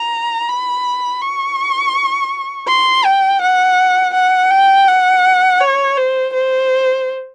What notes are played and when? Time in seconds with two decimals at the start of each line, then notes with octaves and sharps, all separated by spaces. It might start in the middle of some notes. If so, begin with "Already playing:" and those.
Already playing: A#5
0.49 B5
1.22 C#6
2.68 C6
3.05 G5
3.42 F#5
4.14 F#5
4.50 G5
4.88 F#5
5.60 C#5
5.97 C5
6.33 C5